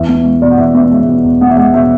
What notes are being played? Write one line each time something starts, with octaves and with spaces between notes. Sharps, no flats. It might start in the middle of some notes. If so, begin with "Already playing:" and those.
Already playing: E2 E5
B3
G#3
B2 D5
F#5
E2 E5
B3 E5
G#3 E5
B2
E2
B3 F#5
E5
G#3 F#5
B2 E5